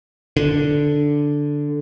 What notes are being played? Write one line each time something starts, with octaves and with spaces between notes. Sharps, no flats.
D3